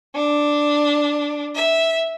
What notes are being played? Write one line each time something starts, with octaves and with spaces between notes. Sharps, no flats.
D4
E5